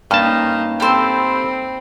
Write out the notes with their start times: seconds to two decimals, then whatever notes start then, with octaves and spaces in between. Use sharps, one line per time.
0.11 G2 A#3 C#4 D#4 A5
0.80 C4 G4 A4 C5 B5 E6